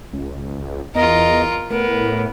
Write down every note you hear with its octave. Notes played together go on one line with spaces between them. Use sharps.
C#2
E2 F4 A#4 D#5
A2 B3 A#4